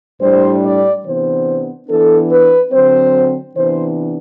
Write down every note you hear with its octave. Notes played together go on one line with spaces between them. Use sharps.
A2 G3 D4 C5
D5
C3 E3 B3 D4 C5
E3 B3 D4 A4
B4
D3 F#3 C4 C5
C3 E3 B3 D4 C5